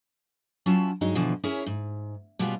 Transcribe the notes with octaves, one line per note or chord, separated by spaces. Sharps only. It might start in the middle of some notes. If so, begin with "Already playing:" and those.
F#3 C#4 E4 F4 A5
G2 F#3 G#3 D#4
E2 B2 D3 E3 F3
C#4 E4 G#4 A#4 C#5
G#2
B2 G3 G#3 B3 C#4 F4